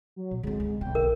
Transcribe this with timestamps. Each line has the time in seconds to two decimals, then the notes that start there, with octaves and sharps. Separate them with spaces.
0.16 F#3
0.31 B2
0.43 D3 G#3 C4
0.60 C2
0.81 B1 D3 G5
0.95 A#4